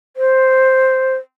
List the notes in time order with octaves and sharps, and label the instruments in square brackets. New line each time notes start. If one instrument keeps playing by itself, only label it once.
[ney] C5